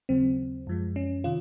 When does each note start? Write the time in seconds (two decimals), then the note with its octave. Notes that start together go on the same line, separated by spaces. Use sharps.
0.09 D#2 C#3 F#3 C4
0.67 F#2 F3 G#3
0.96 C#4
1.24 C3 D#3 F4